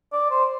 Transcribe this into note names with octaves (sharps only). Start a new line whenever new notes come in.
D5
C5